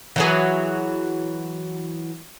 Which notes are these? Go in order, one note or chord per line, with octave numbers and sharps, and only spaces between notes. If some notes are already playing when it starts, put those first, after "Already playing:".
E3 F#3 G#4